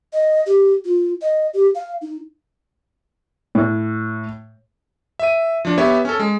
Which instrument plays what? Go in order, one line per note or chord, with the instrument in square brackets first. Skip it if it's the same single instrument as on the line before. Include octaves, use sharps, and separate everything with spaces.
[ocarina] D#5
G4
F4
D#5
G4
F5
D#4
[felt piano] A2
[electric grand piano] E5 D#7
F3 D4
B3 G4 C#5 E5
C#4 A4
G#3